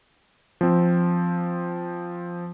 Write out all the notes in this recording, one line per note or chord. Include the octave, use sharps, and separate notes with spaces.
F3 C4